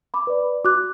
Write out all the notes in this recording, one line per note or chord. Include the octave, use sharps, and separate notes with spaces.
B5 D6
B4 D5
F#4 D6 F#6